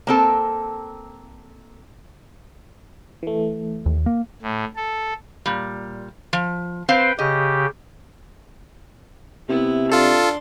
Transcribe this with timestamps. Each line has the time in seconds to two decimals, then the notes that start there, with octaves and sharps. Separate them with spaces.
0.07 A#3 C4 A4
3.23 E3 A3
3.86 D#2
4.06 A#3
4.42 A2
4.76 A4
5.46 A#2 G3
6.33 F3
6.89 C4 B4 C5 F5 G5
7.19 C#3 G4 D#5
9.49 C3 B3 E4
9.92 D4 F4 A4 C6